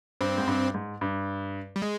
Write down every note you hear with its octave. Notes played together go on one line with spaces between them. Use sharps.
G2 C4
G#2
G2
G#2
G2
G3
G#3